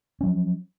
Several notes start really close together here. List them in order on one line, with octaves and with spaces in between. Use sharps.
C#4 F#3 F3